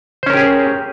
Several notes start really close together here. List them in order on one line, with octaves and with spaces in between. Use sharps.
C5 C#4 A#4 G4 G#4